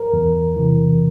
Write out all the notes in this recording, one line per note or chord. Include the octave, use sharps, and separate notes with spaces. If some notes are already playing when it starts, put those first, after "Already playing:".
Already playing: A#4
E2
C3 E3